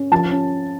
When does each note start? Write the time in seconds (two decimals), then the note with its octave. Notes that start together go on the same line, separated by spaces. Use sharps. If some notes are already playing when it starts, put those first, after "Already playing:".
Already playing: C#4
0.12 F3 A5
0.31 C#4